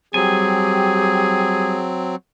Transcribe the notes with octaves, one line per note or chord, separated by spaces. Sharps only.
F#3 G3 C4 G4 G#4 G#5